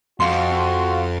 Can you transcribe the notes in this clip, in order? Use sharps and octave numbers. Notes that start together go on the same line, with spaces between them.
F2 F#4 F5 C6